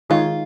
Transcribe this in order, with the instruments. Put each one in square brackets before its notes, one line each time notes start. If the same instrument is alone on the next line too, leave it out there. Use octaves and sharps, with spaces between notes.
[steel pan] D#3 G#3 D#4 G#4 C#5 [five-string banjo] F4